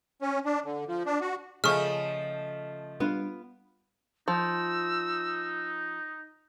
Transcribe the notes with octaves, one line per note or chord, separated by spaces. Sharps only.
C#4
D4
D3
F3
D4
F#4
C#3 F3 A3 D#5 C#6 F6
G3 B3 D4 F4
F3 D#4 E6